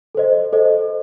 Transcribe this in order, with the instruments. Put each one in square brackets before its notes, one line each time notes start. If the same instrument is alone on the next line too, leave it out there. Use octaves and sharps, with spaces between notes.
[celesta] A4 C5 D#5
A4 C5 D#5